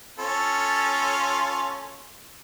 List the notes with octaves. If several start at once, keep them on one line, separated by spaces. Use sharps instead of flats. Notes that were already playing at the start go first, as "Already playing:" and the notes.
C#4 F4 A4